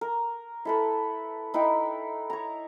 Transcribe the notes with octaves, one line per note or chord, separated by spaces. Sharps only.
A#4
E4 A4 B4
D#4 E4 B4 G5
C#5 A#5